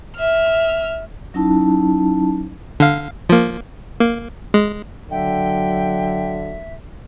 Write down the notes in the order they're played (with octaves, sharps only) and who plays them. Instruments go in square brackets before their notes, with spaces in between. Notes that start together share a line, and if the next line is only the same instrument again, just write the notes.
[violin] E5 F6
[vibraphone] F#3 C#4 D#4 E4 A5
[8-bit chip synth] D3 F5
F3 A#3
A#3
G#3
[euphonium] D3 [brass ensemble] F#3 [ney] E5 [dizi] G5